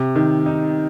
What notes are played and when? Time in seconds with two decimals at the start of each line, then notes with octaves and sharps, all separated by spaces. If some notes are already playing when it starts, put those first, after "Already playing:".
Already playing: C3
0.15 D#3
0.46 D#4